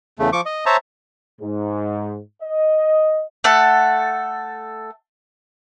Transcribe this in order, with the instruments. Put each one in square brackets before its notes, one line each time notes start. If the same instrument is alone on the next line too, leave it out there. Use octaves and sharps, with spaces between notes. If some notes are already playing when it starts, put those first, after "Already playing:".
[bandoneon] E2 C#3 A3
F3 C#6 D6
D#5
C5 C#5 E5 A5 A#5
[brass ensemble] G#2
D#5
[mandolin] A3 A4 F#5